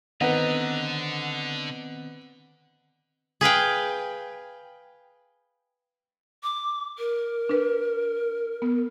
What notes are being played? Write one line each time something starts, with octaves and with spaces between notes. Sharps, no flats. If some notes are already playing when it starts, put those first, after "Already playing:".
D3 D#3 B3 C4 B4 D#5 F#5 A#5
G#4 B4 F5 G5
D6
A#4
D4 B4
B3